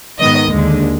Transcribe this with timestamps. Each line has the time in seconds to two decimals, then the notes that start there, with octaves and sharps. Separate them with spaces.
0.19 G#2 D#3 B3 D#5
0.51 D#2 D3 G#3